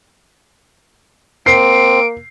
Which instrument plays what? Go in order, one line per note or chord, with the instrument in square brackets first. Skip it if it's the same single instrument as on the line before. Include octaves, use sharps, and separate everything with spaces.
[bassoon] A#3 [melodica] C4 [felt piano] C7 [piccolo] D7